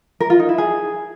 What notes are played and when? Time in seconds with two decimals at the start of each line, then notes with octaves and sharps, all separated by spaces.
0.20 A#4
0.30 F4
0.39 D#4
0.49 E4
0.58 G#4